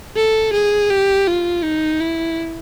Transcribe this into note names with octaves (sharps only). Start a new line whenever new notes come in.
A4
G#4
G4
F4
D#4
E4